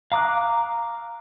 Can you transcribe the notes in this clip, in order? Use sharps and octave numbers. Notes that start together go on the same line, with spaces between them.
F5 A#5 D6 D#6 F#6